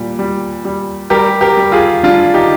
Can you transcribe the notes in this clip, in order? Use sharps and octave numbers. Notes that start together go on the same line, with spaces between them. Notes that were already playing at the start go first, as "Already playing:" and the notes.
Already playing: A#2 G3
G3
G3
G3 G4 A#4
G4 A#4
G3
F4 G#4
G3 D4 F4
D#4 G4